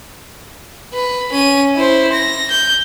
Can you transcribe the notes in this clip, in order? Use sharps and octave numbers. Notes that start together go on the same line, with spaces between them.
B4
C#4 D#7
E4 C5
A#6
G6